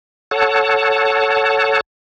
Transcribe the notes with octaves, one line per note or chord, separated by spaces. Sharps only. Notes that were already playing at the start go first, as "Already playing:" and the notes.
A4 C#5 F#5 A5